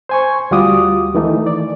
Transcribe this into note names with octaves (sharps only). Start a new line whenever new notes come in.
C5 G#5 C#6
D2 G3 F4 F#4 D6 D#6
D#3 E3 A3 D#4
D5